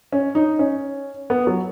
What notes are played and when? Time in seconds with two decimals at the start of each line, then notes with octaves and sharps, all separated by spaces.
0.12 C#4
0.35 D#4
0.59 C#4
1.30 B3
1.47 F#3